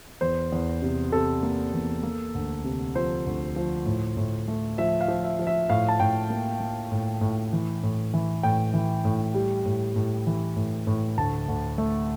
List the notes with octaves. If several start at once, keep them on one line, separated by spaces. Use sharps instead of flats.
E2 C5
E2
C3
C3 A4
A#3
E2
A#3
D2
C3
F3 C5
D2
F3
A2
A2
A3
F3 E5
F5
F3
E5
F3
E5
A2 F5
A5
A2 G5
A#3
A#3
A2
A2
E3
A2
E3
A2 G5
E3
A2
G3
A2
A2
E3
A2
A2
D2 A5
D2
A3